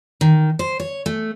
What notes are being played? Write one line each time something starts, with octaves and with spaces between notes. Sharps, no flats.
D#3
C5
C#5
A3